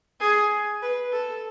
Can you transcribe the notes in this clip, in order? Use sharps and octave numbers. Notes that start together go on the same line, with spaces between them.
G#4
B4
A4